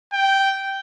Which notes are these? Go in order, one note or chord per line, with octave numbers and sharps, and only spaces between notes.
G5